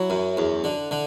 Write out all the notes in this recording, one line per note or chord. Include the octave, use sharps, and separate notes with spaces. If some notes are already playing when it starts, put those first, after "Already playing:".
Already playing: F#3 E4
F#2
E2
D3
D3